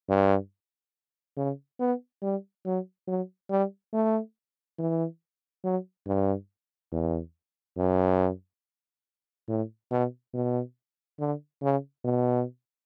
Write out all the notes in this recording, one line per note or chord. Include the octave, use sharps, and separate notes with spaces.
G2
C#3
B3
G3
F#3
F#3
G3
A3
E3
F#3
G2
E2
F#2
A2
B2
B2
D3
C#3
B2